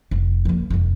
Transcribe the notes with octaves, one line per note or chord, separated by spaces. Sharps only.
F1
F3 A#3
F1 E2